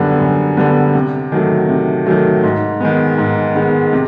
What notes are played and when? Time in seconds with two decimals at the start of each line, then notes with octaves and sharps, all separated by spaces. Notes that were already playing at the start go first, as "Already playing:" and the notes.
Already playing: F#2 D3 G3 B3
0.20 F#2
0.57 D3 G3 B3
0.95 C3
1.32 D#3 F#3 A3
1.68 C3
2.06 D#3 F#3 A3
2.43 G#2
2.80 D#3 G#3 B3
3.18 G#2
3.55 D#3 G#3 B3
3.93 C3